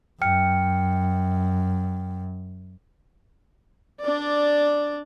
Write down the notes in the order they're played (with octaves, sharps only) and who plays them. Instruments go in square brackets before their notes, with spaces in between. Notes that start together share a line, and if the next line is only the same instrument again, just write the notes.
[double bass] F#2 [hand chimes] G5 F6 C#7
[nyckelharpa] D4 D5